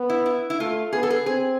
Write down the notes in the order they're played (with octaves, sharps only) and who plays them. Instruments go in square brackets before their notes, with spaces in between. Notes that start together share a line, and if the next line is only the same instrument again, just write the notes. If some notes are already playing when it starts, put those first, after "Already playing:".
Already playing: [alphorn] B3
[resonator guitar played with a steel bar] E4
E4
E4
[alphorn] A3 [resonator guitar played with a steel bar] F4
[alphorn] B3 [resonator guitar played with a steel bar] G#4
[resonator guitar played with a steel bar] A4
G#4
[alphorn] C4 [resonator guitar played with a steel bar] G#4